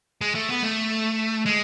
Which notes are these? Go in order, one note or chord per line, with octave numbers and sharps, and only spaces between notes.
G#3
A3
B3
A3
G#3